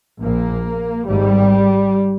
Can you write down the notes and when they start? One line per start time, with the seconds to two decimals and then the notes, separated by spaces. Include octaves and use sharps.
0.22 A#1 A#2 A#3
1.07 G#1 G#2 G3